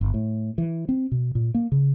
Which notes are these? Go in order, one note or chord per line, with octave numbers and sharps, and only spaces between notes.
G1
A2
E3
C4
B2
A#2
A#3
C#3